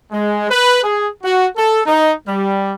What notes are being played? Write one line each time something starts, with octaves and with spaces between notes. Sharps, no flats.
G#3
B4
G#4
F#4
A4
D#4
G3